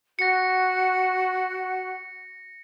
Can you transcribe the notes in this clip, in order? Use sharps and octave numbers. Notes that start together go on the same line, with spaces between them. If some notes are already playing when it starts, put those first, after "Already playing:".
F#4 A#6 C#7